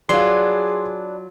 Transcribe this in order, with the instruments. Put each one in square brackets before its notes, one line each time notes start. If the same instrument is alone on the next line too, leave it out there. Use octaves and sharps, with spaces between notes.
[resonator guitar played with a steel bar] F#3 F4 [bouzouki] D4 B4 [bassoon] G#4 [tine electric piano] C6